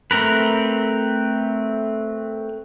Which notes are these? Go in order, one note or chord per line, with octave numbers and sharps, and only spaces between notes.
A3 C4 A#4 B4